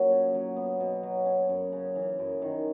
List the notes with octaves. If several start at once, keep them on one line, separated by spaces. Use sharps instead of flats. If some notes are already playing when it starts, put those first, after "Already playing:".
Already playing: A#2 F#3 C#4
C#3
F#3
B3
B2
F#3
C#4
F#2
C#3
E3
F#2
D#3